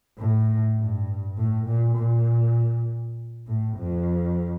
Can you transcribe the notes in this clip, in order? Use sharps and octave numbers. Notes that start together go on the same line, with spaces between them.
A2
G2
A2
A#2
A#2
A2
F2